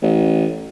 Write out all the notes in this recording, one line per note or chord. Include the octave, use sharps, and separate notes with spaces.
A1